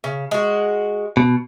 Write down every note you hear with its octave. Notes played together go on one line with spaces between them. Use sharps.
C#3
G#3 F#4
B2